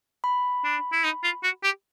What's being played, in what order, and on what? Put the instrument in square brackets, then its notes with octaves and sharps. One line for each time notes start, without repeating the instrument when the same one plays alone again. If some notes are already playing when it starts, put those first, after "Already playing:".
[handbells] B5
[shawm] D4
E4
D#4
F4
F#4
G4